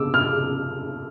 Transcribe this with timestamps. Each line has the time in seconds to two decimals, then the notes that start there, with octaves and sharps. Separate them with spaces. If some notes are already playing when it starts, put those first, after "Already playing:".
Already playing: D6 E6
0.14 F6